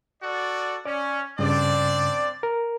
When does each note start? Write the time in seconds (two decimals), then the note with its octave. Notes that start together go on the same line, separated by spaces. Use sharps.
0.23 F#4 A4 D5
0.86 C#4 D5
1.39 G2 C#3 C4 D4 D5
2.43 A#4